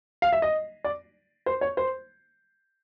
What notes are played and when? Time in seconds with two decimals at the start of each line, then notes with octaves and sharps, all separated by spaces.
0.22 F5
0.32 E5
0.42 D#5
0.84 D5
1.46 C5
1.61 C#5
1.77 C5